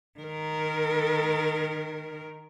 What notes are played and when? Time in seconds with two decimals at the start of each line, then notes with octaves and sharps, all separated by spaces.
0.19 D#3 A#4